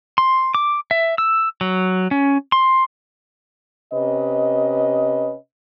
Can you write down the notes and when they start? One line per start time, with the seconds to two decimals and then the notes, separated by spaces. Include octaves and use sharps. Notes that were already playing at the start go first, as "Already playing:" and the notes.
0.18 C6
0.55 D6
0.91 E5
1.18 E6
1.61 F#3
2.11 C#4
2.52 C6
3.93 C3 C#4 B4 D#5